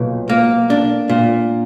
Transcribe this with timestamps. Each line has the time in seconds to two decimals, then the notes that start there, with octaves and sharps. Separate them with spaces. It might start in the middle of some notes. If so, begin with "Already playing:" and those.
Already playing: B1 A#2
0.29 A#3
0.70 D4
1.09 A#2